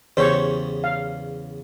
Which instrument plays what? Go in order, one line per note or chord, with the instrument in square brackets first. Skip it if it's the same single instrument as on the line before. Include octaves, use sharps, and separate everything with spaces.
[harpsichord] E2 C#3 G4 [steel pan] C5 C#5 C#6
[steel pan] F5